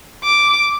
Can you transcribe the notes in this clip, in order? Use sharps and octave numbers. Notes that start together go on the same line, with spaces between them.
D6